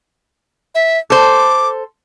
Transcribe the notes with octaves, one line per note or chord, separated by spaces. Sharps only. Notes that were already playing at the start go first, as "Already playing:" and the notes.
E5
A4 C5 D6